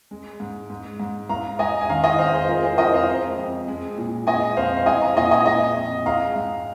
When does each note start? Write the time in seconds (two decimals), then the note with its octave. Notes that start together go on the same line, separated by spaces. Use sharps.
0.11 G#3
0.40 G#2
0.70 G#2
1.00 G#2
1.29 G#2 F5 A#5
1.59 G#2 D#5 G#5
1.81 G#5
1.89 D#3 F5 A#5
2.04 D#5 G#5
2.18 F2 C5 F5
2.34 G#4 C5
2.48 G#3 F4 A#4
2.63 G#4 C5
2.78 F2 A#4 D#5
2.93 C5 F5
3.08 G#3
3.38 F2
3.68 G#3
3.97 A#2
4.27 G#3 D#5 G#5
4.57 F2 C5 F5
4.77 F5
4.86 G#3 D#5 G#5
5.01 F5 A#5
5.16 A#2 D#5 G#5
5.31 D#5 G#5
5.46 G#3 D#5 G#5
5.76 F2
6.06 G#3 F5 A#5
6.36 G#2